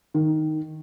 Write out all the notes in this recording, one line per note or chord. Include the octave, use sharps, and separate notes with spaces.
D#3